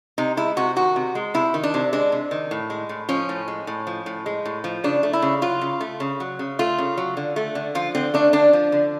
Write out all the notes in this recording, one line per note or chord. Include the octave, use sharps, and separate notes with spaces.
C3 D#4
G#3 E4
C3 F#4
D#3 F#4
C3
G#3
C3 E4
D#3
D4
C3
G#3 D4
C3
D#3
A2
G#3
A2
F3 C#4
A2
G#3
A2
F3
A2
G#3
A2
F3
C#3 D4
A3
E4
C#3
F#3 F4
C#3
A3
C#3
F#3
C#3
A3 F4
C#3
F#3
D3
A3
D3
F3 F4
D3 C4
A3 D4
D3 D4
F3
D3